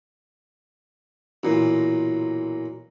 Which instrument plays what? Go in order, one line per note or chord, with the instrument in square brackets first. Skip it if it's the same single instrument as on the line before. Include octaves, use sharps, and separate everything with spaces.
[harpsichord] B1 A#2 [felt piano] E3